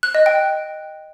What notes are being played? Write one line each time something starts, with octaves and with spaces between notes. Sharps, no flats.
F#6
D#5
G5